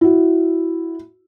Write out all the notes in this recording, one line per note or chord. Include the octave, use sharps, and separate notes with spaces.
E4 F#4